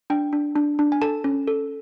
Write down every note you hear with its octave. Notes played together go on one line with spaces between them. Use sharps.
D4 G5
D4
D4
D4
G#5
A4 A5
C#4
A4